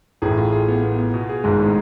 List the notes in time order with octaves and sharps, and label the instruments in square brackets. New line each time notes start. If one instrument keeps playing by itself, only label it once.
[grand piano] A1 A2 [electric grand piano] G#4
[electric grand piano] F4
G#4
B3
B3
B3
B2
G#4
[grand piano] G#1 G#2 [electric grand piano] G#3
[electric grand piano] A2